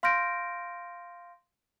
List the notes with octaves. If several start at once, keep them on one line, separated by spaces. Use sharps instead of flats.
F5 C6 F6 G6 A#6 D7